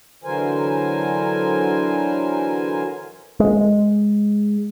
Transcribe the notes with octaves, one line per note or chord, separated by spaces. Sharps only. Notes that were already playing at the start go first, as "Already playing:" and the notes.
D3 E3 F#3 A#4 C5 G#5
G#3